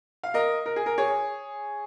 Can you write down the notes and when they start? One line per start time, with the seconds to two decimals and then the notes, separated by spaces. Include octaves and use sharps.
0.23 F5
0.34 A#4 D#5
0.66 A#4
0.76 G#4
0.86 A#4
0.98 G#4 C#5